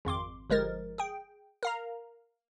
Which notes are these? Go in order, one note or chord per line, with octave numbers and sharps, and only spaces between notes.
G#1 F2 C6 D6
G1 F3 G#3 A#4 A6
G#4 G5
A#4 F5 A#5